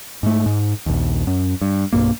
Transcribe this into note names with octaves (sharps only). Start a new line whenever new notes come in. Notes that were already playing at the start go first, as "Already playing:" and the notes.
G#2 A3
G#2
A#1 D#2
F#2
G2
B1 G2 A#3